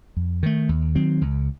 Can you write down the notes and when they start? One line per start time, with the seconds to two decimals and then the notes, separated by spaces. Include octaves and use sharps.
0.17 F2
0.43 D#3 A3
0.69 D#2
0.95 D#3 F#3 C4
1.21 C#2